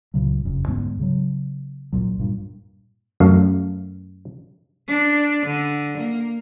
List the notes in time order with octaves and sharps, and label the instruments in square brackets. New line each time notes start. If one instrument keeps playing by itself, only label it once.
[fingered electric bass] C#2 A#2 C#3 F#3
F#1 F2 C#3
D2 G#2 G#3 B3
C#3 F#3
A1 D2 A#2 F#3
G2 A#2
[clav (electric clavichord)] F#2 A3 F5
[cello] D4
D3
A#3